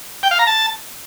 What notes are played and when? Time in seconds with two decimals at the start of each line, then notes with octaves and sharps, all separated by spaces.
0.23 G5
0.31 F5
0.39 A#5
0.47 A5